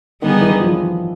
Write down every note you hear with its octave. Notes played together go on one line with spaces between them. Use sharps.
D3 D#3 G3 B3 D#4 G#4
E3
F3